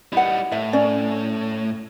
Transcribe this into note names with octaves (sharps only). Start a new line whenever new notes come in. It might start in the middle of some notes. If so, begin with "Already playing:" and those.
G3 D#4 E4 F#5
A2 E5
C#4 D5